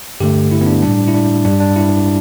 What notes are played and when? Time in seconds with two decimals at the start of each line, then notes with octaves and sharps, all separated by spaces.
0.20 G2 D3 A3 G4
0.51 E4
0.61 B3
0.66 D4
0.82 A2 G3 D4
1.08 E4
1.14 D4
1.45 G2 G3 D4
1.60 D4
1.76 E4